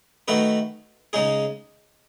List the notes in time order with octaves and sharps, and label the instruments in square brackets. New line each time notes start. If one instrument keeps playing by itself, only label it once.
[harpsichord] D#3 A3 D#4 F#4 B4
C#3 G#3 D#4 G#4